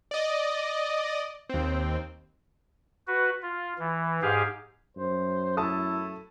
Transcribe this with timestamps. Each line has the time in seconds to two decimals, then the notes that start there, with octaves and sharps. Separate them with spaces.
0.11 D5 D#5
1.49 D#2 C4
3.07 F#4 B4
3.42 F4
3.79 E3
4.22 G#2 G4 G#4 F5
4.97 F#2 C5
5.57 A3 E4 A5 D#6